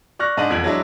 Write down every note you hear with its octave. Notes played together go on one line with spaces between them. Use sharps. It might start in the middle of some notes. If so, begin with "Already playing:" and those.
D5 C#6 F6 F#6 A#6
G#2 D4 D#5 D#7 F#7
E1 F2 G#6 F#7
F#3 G#3 D4 E4